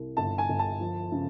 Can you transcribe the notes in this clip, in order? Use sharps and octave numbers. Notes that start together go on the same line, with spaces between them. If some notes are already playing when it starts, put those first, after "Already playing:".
Already playing: C2
G1 A5
G#5
G1
A5
F3
C#3